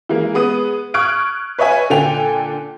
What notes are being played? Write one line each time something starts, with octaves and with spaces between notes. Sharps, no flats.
E3 G#3 A#3
G#3 B3 D#6 D#7
C#6 D#6 F6 F#6 G#6 D7
B4 C#5 D#5 E5 G#5
A#2 D3 A4 G5 G#5 F7